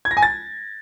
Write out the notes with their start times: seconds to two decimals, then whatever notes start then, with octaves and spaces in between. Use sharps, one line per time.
0.05 G#6
0.11 A#6
0.17 G#5
0.23 A6